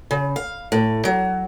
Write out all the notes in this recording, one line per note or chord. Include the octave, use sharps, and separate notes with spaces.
C#3
F5
A2
F#3